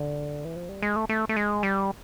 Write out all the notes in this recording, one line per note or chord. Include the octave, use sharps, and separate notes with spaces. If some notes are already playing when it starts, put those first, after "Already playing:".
Already playing: D3
E3
F3
G3
G#3
A3
A3
A3
G#3
G3